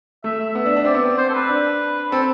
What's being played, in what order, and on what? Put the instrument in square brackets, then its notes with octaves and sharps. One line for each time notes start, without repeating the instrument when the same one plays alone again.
[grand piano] A3 [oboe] E5
[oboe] E5
[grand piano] B3
D4
D4
[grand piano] C4 [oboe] D5
[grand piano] B3
C4
[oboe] C5
A4
B4
[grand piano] D4
[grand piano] C4 [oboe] A4